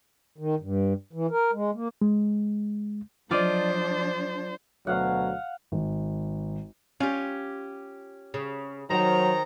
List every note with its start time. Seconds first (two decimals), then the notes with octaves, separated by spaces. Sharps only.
0.38 D#3
0.60 G2
1.13 E3
1.31 A#4
1.53 G#3
1.74 A#3
2.01 G#3
3.31 F3 F#3 D4 F4 C5 D5 D#5
4.87 D2 B2 F#3 F5 F#5
5.72 G#1
7.00 C#4 F4 G4
8.34 C#3
8.91 D#3 F#3 C4 A#5